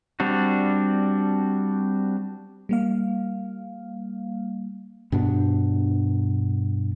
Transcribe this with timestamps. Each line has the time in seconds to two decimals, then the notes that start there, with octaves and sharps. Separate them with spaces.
0.20 G3 C4 D4 F#4
2.69 G3 A#3 F5
5.12 G2 B2 B3 D4